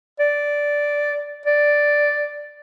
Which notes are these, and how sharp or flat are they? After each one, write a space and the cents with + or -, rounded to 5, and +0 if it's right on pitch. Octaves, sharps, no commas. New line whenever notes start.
D5 -5
D5 +0